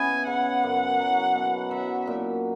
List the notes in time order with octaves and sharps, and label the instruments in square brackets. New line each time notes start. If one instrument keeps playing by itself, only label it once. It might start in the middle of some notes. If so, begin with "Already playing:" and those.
Already playing: [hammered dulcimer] C#3 B3 E4 [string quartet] G#5
[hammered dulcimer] C#3 [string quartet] F#5
[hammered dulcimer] F#2
F#3
B2
[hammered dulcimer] F#3 [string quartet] E5
[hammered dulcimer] A#2